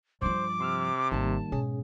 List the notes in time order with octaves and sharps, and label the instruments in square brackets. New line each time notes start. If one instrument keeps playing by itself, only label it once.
[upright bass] G2 F3 [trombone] C5 [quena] D6
[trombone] C3 [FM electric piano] C6 E6 F6
[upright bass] G#1 [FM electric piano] D#3 G3 A#3 [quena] A5
[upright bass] G#2 B2 [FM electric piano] C#4 G#4